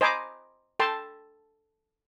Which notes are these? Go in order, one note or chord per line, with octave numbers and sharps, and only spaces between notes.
C5 D#5 G#5 A#5 B5 D6
A4 G5 A5 C6